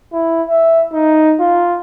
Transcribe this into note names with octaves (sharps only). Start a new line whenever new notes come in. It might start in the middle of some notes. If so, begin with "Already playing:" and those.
E4
E5
D#4
F4